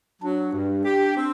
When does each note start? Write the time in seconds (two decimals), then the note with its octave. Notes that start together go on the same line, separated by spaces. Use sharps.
0.22 F#3 D4
0.53 G2
0.85 G4
1.16 C4